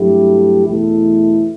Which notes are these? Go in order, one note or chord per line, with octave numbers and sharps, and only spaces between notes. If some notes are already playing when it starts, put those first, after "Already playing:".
Already playing: G2 F#3 A3 E4 G4
E2 B2 A3 E4